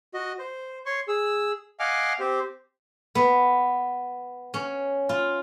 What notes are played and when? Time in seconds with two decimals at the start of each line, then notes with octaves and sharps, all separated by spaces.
0.14 F#4 D#5
0.39 C5
0.86 C#5 C6 C#6
1.08 G#4 E6
1.80 D#5 F5 F#5 G#5 D6 F6
2.20 C4 G4 C5
3.15 B3
4.54 C#4
5.09 F4